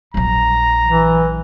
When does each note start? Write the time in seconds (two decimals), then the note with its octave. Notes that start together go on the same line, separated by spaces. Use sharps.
0.14 A#1 F#3 A#5
0.86 E3